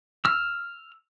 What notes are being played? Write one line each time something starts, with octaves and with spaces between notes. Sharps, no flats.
E6 F6